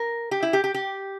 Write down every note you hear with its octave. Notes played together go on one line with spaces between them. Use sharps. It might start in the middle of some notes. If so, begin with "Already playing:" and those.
Already playing: A#4
G4
E4
G4
G4
G4